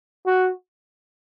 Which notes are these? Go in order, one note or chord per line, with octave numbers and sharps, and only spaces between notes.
F#4